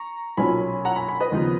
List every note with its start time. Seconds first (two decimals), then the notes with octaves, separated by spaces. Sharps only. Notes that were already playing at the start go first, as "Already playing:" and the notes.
Already playing: A#5 C#6
0.37 B1 A#2 F#3 C#4 G#5 B5
0.85 F#5 A#5
0.96 G#5 B5
1.08 G#5 B5
1.20 B4 D#5
1.32 D#2 C#3 F3 B3 D#4